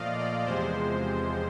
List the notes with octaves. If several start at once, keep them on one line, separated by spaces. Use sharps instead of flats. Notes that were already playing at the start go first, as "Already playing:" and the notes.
Already playing: A#2 F3 A3 D5 D#5 F5
D5
E2 C3 F3 G#3 C5